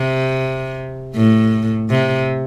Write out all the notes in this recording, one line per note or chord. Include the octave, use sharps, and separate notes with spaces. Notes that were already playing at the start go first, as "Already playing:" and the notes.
Already playing: C3
A2
C3